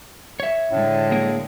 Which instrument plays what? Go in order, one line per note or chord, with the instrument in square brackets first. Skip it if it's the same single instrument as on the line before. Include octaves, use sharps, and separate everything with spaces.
[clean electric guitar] C#5 E5
[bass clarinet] A2 [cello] D3 G#3
[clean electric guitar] A#3 G#4 A#4